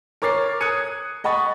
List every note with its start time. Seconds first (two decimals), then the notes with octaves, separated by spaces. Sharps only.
0.22 A#4 C#5 D6 A6 C7
0.60 D#6 F#6 G#6 C#7 D#7
1.24 D#5 F#5 B5 C#6 A6